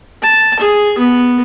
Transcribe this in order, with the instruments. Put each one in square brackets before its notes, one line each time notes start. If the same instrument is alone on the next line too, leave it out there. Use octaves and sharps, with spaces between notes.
[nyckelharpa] A5
G#4
B3